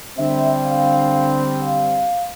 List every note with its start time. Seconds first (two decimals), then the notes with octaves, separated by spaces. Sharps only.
0.18 D3 G3 C4 E5
0.65 F5
1.62 F5